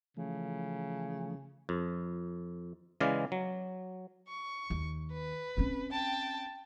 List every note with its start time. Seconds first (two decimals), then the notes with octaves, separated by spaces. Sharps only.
0.17 C#3 E3 F3 A3
1.69 F2
3.00 C#3 E3 G#3 D5 F5
3.32 F#3
4.28 C#6
4.70 D#2
5.12 B4
5.57 C4 C#4
5.92 G5 A5